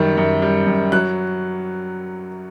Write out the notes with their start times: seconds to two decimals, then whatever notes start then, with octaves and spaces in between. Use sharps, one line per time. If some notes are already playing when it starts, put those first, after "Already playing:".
Already playing: F#2 D#3 G3
0.17 F#2
0.42 G3
0.67 F#2
0.92 F#3 F#6